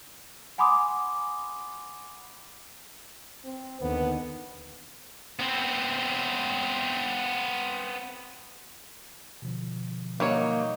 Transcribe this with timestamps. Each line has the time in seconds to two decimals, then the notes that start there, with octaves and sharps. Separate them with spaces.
0.58 F#5 G#5 B5 C6 D6 D#6
3.45 C4
3.81 D#2 D3 B3
5.39 B3 C4
9.42 B2 D3 F3
10.20 F#3 G3 A#3 D#4 C#5